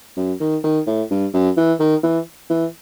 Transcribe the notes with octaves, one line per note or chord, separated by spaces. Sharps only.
F#2
D#3
D#3
A2
G2
F#2
E3
D#3
E3
E3